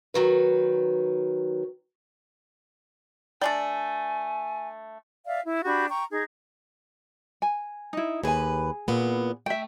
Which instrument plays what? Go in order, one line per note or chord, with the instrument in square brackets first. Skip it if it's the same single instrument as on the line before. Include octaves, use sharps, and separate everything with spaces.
[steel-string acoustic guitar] D#3 F#3 B4
[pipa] A3 D4 G5 [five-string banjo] D5 [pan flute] G#5
[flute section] D5 E5 F5
E4
D4 F#4 G4 B5
G5 A#5 C#6
D#4 G#4
[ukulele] G#5
D#4 E4
[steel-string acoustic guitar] D#2 B4 [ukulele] G#4 G#5
[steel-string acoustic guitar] E2 A#2 B3
[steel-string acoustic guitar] A3 [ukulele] E5 G5